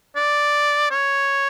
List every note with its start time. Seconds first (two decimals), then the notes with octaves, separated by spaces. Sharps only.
0.16 D5
0.90 C#5